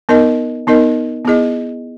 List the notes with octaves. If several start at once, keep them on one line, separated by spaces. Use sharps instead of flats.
B3 D#4 A#4 D#5
B3 D#4 A#4 D#5
B3 E4 G#4 D#5